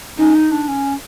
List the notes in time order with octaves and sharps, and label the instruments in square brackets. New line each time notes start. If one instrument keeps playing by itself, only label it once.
[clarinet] C#4 [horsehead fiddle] D#4
[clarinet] D#4
D4
C#4